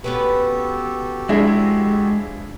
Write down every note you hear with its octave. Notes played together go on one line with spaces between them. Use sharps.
B3 C#4 F#4 G4 A4 B4
F3 G#3 D4 E4 G#4